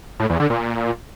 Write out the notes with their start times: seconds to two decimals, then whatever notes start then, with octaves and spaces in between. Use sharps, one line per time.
0.20 A2
0.30 E2
0.40 D3
0.50 A#2